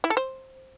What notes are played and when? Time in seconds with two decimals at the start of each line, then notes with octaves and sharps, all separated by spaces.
0.04 E4
0.10 A4
0.17 C5